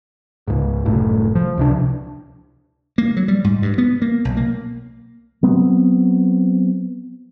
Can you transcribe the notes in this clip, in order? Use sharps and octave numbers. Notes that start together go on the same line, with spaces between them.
C#2 G#2
F#1 C2 A2
F3
C#2 C3 D4
A#3
F#3
G3
G#2
G2
B3
A#3
B1
A#3
F#3 B3 C4